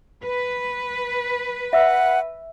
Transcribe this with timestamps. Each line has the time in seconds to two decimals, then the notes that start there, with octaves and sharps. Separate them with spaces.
0.23 B4
1.73 E5 F#5 E6